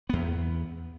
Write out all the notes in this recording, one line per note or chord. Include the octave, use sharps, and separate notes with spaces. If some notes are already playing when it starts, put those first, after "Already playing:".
E2 B3